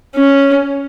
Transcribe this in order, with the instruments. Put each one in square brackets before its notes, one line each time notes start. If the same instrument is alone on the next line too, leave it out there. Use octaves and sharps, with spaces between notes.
[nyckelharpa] C#4